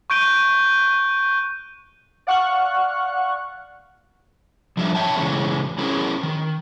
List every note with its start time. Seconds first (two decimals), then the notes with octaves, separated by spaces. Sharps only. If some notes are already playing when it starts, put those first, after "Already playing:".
0.10 C#6 F#6 G6 D7 D#7 G7
2.27 D5 F5 F#5 C#6 F6 F#6
4.77 F3 G3 D4 F4 A4 E5
4.95 C#5 E5 F5 G5 A5
5.16 C#3 E3 G#3 C#4
5.78 C#4 E4 G#4 A#4
6.23 D#3